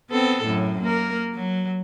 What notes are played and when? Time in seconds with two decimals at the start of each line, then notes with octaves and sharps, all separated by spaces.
0.11 B3 C4 A4
0.44 F#2 A2
0.82 A#3 A#4
1.35 F#3